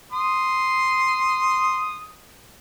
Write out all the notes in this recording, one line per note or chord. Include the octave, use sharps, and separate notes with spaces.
C6 D#6